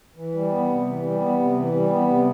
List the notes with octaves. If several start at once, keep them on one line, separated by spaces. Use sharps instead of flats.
E3
G3
B3
C3
E3
G3
B3
C3
E3
G3
B3
C3